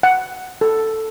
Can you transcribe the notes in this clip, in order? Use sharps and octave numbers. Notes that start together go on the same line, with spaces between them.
F#5
A4